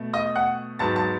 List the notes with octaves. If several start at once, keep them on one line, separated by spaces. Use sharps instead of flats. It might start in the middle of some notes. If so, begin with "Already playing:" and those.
Already playing: B2 A3
D#5 D#6
F#5 F#6
G#2 F#3 B3 A5 A6
A5 A6